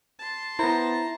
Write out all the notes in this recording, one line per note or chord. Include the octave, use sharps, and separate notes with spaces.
A5 C6
B3 E4 C5 A#5